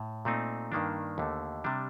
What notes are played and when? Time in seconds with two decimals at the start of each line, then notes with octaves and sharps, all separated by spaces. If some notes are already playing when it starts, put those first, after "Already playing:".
Already playing: A2
0.25 A#2 A3 C4 D#4
0.72 G2 D#3 A#3 D4
1.18 D#2 D3 A3
1.64 C3 G3 D4